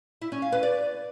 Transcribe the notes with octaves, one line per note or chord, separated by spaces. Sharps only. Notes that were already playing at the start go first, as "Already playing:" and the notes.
E4
C#4
F5
B4
D5